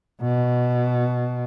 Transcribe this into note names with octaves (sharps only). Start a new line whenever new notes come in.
B2